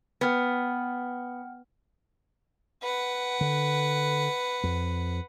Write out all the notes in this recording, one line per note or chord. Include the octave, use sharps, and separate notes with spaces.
B3 F#5 G5 F6
B4 F#5
D3
F2